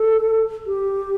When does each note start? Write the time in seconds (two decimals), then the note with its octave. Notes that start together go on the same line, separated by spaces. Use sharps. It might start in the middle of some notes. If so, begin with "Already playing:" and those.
Already playing: A4
0.67 G4